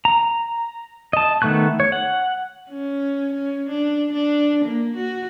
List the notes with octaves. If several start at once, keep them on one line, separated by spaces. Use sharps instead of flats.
A#5
D#5 A5
D#3 A3 B3 C#6 F#6
C#5
F#5
C#4
C#4
D4
D4
A#3
F#4